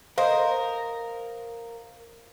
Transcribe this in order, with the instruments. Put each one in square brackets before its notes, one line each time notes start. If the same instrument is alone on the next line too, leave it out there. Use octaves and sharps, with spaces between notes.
[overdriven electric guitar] A#4 [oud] C5 [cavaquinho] D#5 [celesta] F5